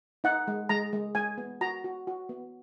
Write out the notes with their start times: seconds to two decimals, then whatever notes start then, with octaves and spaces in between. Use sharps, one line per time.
0.24 D#4 F#5
0.48 G#3
0.69 G#3 A#5
0.93 G#3
1.15 G#3 G#5
1.38 B3
1.61 F#4 A#5
1.84 F#4
2.07 F#4
2.29 B3